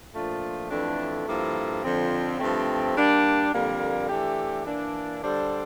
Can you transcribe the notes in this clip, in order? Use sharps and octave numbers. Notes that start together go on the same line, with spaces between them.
A#2 F3 A3 D4 F4
F2 E3 A3 D4
G2 F3 A#3 E4 A4
F2 D3 F3 C4
G2 F3 A3 C4
G3 A#3 D4
F2 D3 G3 A#3
E3 A3 D4 G4
E3 A#3 D4
D3 G3 D4 A4 C5